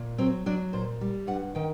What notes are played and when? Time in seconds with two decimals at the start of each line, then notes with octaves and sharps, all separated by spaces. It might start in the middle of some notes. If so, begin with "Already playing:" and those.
Already playing: A#2
0.18 F#3 C4
0.46 F#3 D4
0.73 A#2 C5
1.01 G3
1.27 G2 F#5
1.55 D#3 G5